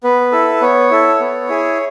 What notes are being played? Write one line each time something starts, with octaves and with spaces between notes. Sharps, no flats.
B3 B4
E4 A4
B3 C#5
E4 A4
B3
E4 G#4